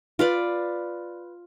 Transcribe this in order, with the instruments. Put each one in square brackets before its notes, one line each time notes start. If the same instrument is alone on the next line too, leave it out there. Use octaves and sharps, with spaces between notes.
[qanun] F4 B4 D5